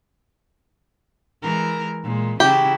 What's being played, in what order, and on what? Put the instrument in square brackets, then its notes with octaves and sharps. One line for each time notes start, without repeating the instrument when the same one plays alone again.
[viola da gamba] E3 G#3 A#4
A#2 G#3
[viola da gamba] C#3 F#3 E4 [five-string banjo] G4